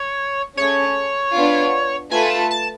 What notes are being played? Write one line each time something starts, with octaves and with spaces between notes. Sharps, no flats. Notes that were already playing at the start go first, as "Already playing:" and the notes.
Already playing: C#5
A3 C#4 G#4 C#5
B3 D4 F4
A3 F4 B4 G#5
A5
A5